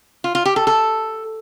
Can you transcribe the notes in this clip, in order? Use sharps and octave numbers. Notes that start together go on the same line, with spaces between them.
F4
F4
G4
A4
A4